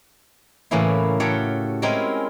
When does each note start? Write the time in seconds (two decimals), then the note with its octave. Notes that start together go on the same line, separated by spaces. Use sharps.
0.71 A2 C#3 E3 A#3 C#4 E4
1.20 F#4 G4 A4 C#5 F5 G5
1.82 G#3 C4 C#4 E4 A#4